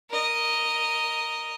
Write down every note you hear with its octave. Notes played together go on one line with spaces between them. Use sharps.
A#4 D#5